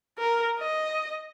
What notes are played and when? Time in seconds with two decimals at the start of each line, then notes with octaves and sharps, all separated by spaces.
0.18 A#4
0.60 D#5